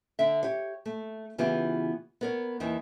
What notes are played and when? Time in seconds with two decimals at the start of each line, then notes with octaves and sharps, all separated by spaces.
0.19 D3 E5
0.43 G4 C#5
0.86 A3
1.38 C#3 E3 B3 F4 G4
2.21 B3 A#4 C#5
2.60 D#2 D#3 E3